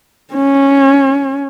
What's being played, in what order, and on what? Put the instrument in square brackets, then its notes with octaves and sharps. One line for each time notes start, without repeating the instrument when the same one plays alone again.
[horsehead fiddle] C#4